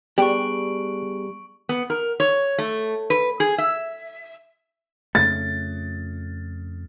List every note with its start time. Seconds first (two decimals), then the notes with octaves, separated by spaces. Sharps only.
0.18 G3 B3 D4 G4 G#4 C#6 D7 F#7
1.69 B3
1.90 A#4
2.20 C#5
2.58 A3
3.10 B4
3.40 G#4
3.58 E5
5.15 F2 C#3 A3 A6